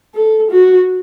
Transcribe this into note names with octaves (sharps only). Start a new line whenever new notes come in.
A4
F#4